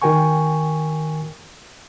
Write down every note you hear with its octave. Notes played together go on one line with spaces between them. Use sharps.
D#3 F#4 A#4 G5 G#5 C#6